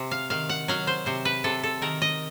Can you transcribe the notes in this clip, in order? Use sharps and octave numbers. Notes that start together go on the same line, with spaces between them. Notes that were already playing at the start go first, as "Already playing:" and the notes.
Already playing: C3
F5
D#3 F5
F#5
F#3 F5
C5
C3 C5
B4
C3 A4
A4
D#3 A#4
D#5